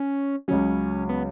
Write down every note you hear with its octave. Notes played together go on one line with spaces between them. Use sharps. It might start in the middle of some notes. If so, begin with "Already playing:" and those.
Already playing: C#4
C#2 C#3 F#3 C#4
B3